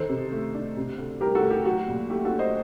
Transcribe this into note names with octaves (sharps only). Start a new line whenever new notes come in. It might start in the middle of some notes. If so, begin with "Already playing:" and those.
Already playing: D#3 D#4 A4 C5
C3
A3
D4
C3
D2
G3 G4 A#4
F#4 A4
D2
G4
F#3 F#4
A#2
A3 G4
F#4 A4
D4
C5 D#5